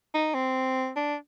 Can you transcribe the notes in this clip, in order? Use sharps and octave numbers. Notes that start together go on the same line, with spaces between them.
D#4
C4
D4